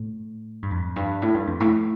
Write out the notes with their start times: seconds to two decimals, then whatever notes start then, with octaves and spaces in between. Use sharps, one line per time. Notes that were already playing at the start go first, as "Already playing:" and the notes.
Already playing: A2
0.62 G2
0.70 F2
0.96 G2
1.22 A2
1.34 G2
1.47 F2
1.60 A2